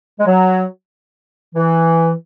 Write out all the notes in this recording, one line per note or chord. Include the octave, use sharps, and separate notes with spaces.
G#3
F#3
E3